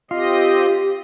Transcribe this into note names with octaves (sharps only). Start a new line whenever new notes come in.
C4 F4 G4 D#5